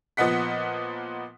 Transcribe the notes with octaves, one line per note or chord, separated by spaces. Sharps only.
A#2 F3 B3 D#5 F#5 B6